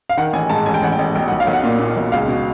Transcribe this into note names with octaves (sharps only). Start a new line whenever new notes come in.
F5
D#3 F#5
A1 G#5
G#2 A5
A1 G#5
G5
A1 F#5
G5
A1
B1 G5
B1 F#5
F5
B1
F#5
A#2
A#2
B1
C#2 F5
B2